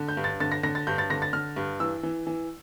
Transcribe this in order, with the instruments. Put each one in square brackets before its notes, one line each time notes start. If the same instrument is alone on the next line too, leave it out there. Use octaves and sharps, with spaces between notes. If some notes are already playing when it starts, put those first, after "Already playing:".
Already playing: [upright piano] D3
G6
G2
A6
D3 A6
A#6
D3 A#6
A6
G2 G6
A6
D3 A#6
A6
D3 F6
G2
E3 E6
E3
E3